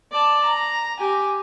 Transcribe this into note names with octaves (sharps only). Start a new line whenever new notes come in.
D5 A5
A#5
G4 G#5